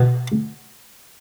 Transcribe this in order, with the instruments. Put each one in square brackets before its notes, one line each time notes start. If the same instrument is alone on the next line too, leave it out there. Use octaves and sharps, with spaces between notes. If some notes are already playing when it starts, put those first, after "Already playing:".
Already playing: [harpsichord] B2